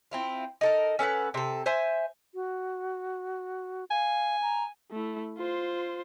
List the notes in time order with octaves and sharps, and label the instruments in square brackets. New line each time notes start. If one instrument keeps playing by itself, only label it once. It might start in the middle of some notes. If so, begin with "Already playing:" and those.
[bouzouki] C4 E4 F4
D#4 A4 A#4
C#4 A4 B4 F#5
C3 A4
C5 E5 G#5
[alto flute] F#4
[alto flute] F5 [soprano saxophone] G#5
[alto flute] A#5
[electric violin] A3 E4
F4 C5